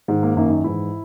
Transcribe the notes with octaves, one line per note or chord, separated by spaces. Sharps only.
G#2 D#3
A#3
F#2 D#3 A#3
D#4
G#2 E3 E4